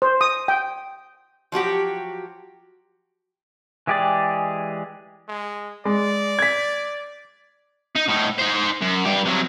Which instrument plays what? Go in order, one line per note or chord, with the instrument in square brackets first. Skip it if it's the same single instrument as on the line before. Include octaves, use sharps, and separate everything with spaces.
[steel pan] C5
D#6
G5
[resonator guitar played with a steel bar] F3 F#3 F#4 G4
[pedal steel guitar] E3 G#3 G4 G#4 D5
[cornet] G#3
[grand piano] G#3 [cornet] D5
[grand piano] G#6 B6
[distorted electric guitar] D#4
A2 D#4
D#4 C5
F#2
G2 G4
C3 F#3